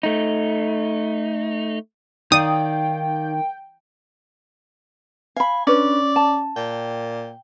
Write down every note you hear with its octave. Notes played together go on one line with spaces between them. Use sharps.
A3 D#4
D#3 D#4 D5 F5 G5 D#6
F5 G#5 B5
C#4 D4 B4 D5
A5
A#2 G5